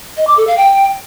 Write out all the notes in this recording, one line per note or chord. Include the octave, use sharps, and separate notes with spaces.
D#5
D6
A4
F5
G5